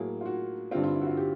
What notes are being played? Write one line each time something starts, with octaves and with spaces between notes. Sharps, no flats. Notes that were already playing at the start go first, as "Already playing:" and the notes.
Already playing: A2 F#3 A#3 G#4
F4
F#4
G2 D3 G3 C4 F4
F4
E4
F#4
F4
G4